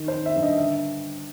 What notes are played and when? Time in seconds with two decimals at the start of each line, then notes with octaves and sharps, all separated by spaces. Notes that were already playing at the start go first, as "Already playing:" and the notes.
Already playing: D#3
0.08 C5
0.14 D#3
0.26 E5
0.36 G2
0.42 D#5
0.58 D3 E5